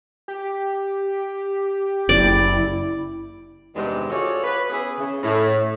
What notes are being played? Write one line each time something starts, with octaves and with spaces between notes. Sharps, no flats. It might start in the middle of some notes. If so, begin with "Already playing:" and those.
G4
F#1 E4 D5
E2 G2 C3 D#3 G#3
F4 F#4 G#4 A4 C#5 D5
B4
B3 C#4 E4 G#4
C#3
A2